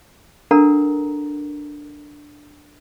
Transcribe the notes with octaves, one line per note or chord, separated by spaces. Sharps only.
D4 A4 A#4 F#5 A#5